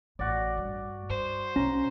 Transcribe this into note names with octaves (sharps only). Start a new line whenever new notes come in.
A1 F#4 D5
G2
G2 C5
B1 C#4 A#5